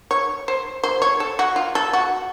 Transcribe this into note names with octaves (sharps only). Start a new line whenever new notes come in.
C#5
C5
C5
C#5
A4
F#4
F4
A4
F#4